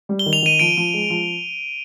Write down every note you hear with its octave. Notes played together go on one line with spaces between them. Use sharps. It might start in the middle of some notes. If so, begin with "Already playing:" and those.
G3
G7
D#3
F7
D#3 D#7
F3 D7
F3
G#3
F3